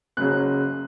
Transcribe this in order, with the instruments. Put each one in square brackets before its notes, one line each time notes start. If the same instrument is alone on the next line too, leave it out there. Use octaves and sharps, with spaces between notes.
[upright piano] F#1 F#2 C#3 F#3 F#6